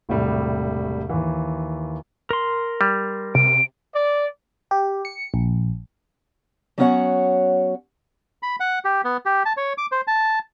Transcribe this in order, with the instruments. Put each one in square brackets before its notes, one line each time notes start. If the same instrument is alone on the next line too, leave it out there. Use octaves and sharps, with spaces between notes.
[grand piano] E1 A2 C3 G3
D#2 E3
[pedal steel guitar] A#4 C6
[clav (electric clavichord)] G3
[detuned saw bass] C3 [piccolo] D7
[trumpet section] D5
[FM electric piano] G4
C#7
A#1
[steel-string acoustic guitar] F#3 B3 C#4 F#4 C#5 F#5
[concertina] B5
F#5
G4
B3
G4
A5
C#5
D6
C5
A5